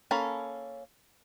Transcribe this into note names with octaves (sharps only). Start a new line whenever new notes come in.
A#3 C#4 A4 B5